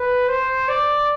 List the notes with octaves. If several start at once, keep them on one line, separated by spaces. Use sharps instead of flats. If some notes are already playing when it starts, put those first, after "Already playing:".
Already playing: B4
C5
D5